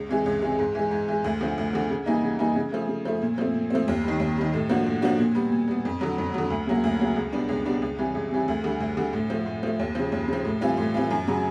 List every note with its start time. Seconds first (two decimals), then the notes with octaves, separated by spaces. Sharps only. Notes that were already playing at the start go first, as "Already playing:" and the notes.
Already playing: C#2
0.09 C3 E3 G#3
0.26 C#2
0.42 C3 E3 G#3
0.59 G#2
0.75 E3 G#3
0.91 G#2
1.08 E3 G#3
1.24 D2
1.41 D3 F3
1.58 D2
1.73 D3 F3
1.90 C#3
2.06 E3 G3 A#3 D#4
2.24 C#3
2.39 E3 G3 A#3 D#4
2.56 C#3
2.72 F3 A3
2.88 C#3
3.05 F3 A3
3.22 A#2
3.38 F3 A3 C4
3.54 A#2
3.70 F3 A3 C4
3.88 D#2
4.03 D#3 G3
4.20 D#2
4.37 D#3 G3
4.54 A2
4.69 F3 A#3 D4 F#4
4.86 A2
5.02 F3 A#3 D4 F#4
5.19 A#2
5.35 G3 B3
5.52 A#2
5.68 G3 B3
5.85 F2
6.01 D3 F#3
6.18 F2
6.34 D3 F#3
6.50 D2
6.67 C#3 F#3 A#3
6.84 D2
6.99 C#3 F#3 A#3
7.16 C#2
7.33 B2 G3 B3 D4
7.49 C#2
7.66 B2 G3 B3 D4
7.82 C#2
7.98 C3 E3 G3
8.15 C#2
8.31 C3 E3 G3
8.48 D2
8.64 D3 G3
8.80 D2
8.97 D3 G3
9.13 A2
9.30 F3 A3
9.46 A2
9.63 F3 A3
9.79 D#2
9.95 C#3 F3
10.12 D#2
10.28 C#3 F3
10.45 A2
10.61 E3 G3 C4 F4
10.77 A2
10.94 E3 G3 C4 F4
11.10 F#2
11.27 C#3 F#3